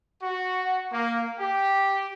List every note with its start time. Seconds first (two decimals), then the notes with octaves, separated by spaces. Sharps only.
0.21 F#4
0.92 A#3
1.38 G4